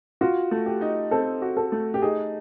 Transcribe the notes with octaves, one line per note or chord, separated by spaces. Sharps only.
F4 F#4
A3
G4
D#4
C4 A4
F#4
A4
A3
G4
D#4 G#4